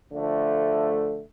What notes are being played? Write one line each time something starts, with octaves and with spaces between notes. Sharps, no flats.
D3 F3 A3